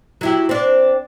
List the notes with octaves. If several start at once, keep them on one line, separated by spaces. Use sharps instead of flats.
F#3 E4 G4
C4 D4